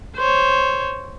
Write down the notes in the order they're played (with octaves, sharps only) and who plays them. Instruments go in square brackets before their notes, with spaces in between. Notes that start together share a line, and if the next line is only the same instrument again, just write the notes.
[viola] C5 C#5